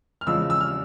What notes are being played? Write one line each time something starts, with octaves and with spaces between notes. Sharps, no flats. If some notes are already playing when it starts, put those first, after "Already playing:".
F6
E2 C#3 F3 G#3 E6
E6
F6